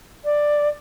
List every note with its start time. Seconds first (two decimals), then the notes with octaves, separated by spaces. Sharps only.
0.25 D5